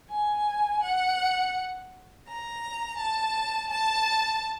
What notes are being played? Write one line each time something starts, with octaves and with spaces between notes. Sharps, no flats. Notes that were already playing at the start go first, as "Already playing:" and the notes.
G#5
F#5
A#5
A5
A5